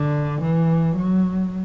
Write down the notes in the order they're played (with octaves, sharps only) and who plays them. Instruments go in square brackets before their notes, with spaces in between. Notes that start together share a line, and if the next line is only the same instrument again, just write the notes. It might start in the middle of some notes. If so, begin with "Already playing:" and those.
Already playing: [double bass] D3
E3
F#3